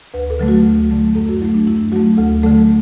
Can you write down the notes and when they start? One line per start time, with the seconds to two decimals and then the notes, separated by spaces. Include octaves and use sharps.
0.14 D2 B4
0.30 A4
0.39 D3 F#3 A3
0.48 F#4
0.65 D2
0.91 D3 F#3 A3
1.15 F#2 A4
1.29 F#4
1.40 F#3 A3 E4
1.54 D4
1.67 F#2 E4
1.92 F#3 A3 F#4
2.17 D2 A4
2.43 D3 F#3 A3 A4